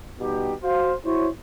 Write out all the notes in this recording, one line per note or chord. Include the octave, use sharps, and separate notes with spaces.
B2 G3 D#4 G4
F#4 C5 F5
E4 F#4 C5 C#5